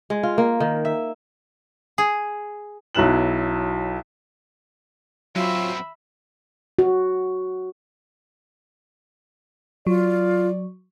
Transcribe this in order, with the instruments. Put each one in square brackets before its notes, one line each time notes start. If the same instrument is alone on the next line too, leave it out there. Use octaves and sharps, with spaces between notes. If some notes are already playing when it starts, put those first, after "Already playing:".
[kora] G#3
F4
A#3
D#3
E5
[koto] G#4
[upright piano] B1 F#3 E4 F#6 E7 F#7
[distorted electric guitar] F#2 C4 [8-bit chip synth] F#3 [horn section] F4 [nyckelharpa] E5 B5
[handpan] F#4
[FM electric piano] F#3 [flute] F4 [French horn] D5